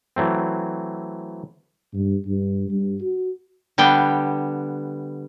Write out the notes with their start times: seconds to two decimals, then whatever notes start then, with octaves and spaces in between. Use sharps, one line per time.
0.16 E3 F#3 A3 C4
1.94 G2
2.26 G2
2.69 G2
3.02 F#4
3.78 D3 G3 B3 G5